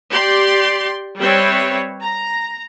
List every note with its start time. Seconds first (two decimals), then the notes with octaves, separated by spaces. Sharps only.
0.12 G4 D5 C6
1.18 G3 C4 B4 C#5 E5
2.00 A#5